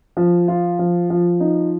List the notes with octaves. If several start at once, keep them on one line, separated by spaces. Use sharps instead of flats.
F3
F4
F3
F3
D#4